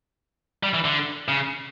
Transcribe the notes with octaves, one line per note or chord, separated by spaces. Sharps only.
G3
E3
D3
C#3